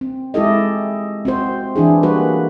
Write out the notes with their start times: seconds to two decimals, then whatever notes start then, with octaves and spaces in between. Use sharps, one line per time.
0.01 C4
0.34 G#3 E4 G4 A4 D#5
1.25 C4 F#4 C5
1.76 E3 D4 E4 G#4
2.03 G3 A#3 F#4 B4